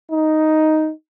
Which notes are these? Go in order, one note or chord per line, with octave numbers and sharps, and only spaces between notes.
D#4